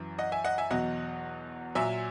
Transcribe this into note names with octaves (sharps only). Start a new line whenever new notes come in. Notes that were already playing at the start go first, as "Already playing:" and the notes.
Already playing: F#2 E3
D#5 F#5
E5 G#5
D#5 F#5
E5 G#5
E2 B2 F#3 D#5 F#5
A#2 F#3 E5 G#5